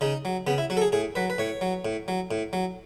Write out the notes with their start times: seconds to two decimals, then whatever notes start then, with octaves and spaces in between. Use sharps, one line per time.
0.01 C#3 D#4
0.25 F#3
0.47 C#3 B3
0.58 E4
0.70 F#3 F#4
0.77 A4
0.81 G#4
0.92 A2 G#4
1.15 F#3 B4
1.30 B4
1.39 A2 C#5
1.61 F#3
1.85 A2
2.08 F#3
2.31 A2
2.53 F#3